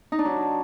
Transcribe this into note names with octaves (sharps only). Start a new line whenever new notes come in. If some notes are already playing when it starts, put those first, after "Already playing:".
D#4
D4
F#3